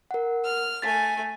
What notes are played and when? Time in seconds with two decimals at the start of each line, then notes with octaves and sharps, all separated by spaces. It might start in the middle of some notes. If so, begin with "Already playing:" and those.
0.11 A#4 F#5
0.45 F6
0.82 A3 G#5 A6 B6